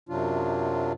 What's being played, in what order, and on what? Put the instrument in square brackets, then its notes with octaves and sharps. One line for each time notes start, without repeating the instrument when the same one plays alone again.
[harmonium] F#2 C3 F#3 D4 F4